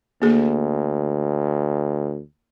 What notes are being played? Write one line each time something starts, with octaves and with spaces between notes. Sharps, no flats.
D2 A#3 G#4